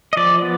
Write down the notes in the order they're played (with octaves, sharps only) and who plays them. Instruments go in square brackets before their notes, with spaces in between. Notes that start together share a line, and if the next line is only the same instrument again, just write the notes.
[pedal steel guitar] D#5
F3 D5
B3